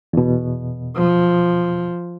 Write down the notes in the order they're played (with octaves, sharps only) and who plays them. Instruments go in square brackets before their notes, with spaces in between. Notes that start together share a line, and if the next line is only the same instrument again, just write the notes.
[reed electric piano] E2 B2
[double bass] F3